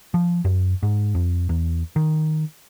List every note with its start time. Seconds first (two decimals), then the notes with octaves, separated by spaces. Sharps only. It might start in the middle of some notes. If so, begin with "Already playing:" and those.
0.14 F3
0.45 F#2
0.83 G#2
1.15 F2
1.49 E2
1.96 D#3